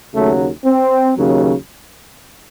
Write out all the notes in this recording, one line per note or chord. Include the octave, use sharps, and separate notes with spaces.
D#2 C#3 F#3 A3
C4
D#2 C#3 F#3